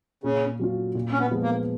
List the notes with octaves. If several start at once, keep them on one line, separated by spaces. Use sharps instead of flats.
A#2 C#3
F#3 C#4 F4
A#2
C#4
B3
F3 G#3 B3
A#3